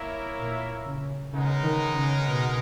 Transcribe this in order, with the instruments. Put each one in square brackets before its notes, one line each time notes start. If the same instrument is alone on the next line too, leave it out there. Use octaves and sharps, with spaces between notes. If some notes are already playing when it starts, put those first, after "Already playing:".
Already playing: [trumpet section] A#3 E4 A#4 C#5 E5
[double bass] A#2
C#3
[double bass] C#3 [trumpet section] G#3 B3 D#4 A#4
[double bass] D#3
C#3
B2